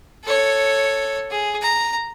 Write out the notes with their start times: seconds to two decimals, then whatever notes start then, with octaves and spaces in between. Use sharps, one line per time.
0.24 A4 C#5
1.31 G#4
1.62 A#5